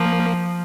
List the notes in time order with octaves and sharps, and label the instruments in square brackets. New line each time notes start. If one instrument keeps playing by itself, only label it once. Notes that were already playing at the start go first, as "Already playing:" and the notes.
Already playing: [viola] F3 [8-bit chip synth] A#3